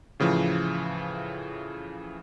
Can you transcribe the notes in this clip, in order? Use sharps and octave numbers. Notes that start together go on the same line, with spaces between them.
A2 C#3 E3 F3